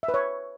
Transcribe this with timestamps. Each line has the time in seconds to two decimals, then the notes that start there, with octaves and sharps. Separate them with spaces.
0.03 E5
0.08 B4
0.14 C#5